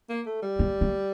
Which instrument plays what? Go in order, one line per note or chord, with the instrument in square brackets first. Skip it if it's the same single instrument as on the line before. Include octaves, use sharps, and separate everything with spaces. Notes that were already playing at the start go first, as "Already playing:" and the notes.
[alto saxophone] A#3
A3
G3
[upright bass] A3
A3